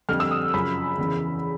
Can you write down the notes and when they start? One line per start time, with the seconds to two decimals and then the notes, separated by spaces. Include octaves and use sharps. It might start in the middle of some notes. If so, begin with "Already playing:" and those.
0.09 F2 D3 G3 F6
0.20 E6
0.31 D#6
0.54 F#2 C#3 F3 B5
0.98 E2 C#3 E3